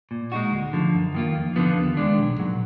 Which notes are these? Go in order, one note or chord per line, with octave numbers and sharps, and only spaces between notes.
A#2
G#3 D#4 F#4
D2
D3 F3
F#2
D#3 A#3 F4
F2
D3 F3 B3 F4
D#2
D#3 G#3 D4
B1
A#2 F#3